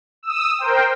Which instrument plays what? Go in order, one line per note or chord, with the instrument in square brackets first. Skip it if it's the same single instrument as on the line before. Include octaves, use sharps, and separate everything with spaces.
[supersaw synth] D#6 E6
A#4 C5 G5